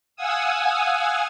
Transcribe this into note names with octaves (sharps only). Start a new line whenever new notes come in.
F5 F#5 G#5 D#6 E6